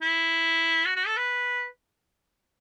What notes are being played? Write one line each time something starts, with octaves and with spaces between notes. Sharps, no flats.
E4
F#4
F#4
A4
B4